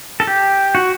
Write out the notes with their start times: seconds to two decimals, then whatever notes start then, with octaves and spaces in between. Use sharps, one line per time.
0.20 A4
0.27 G4
0.75 F#4